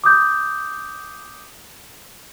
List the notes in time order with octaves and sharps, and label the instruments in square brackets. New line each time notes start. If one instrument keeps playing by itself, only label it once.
[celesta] D6 D#6 G6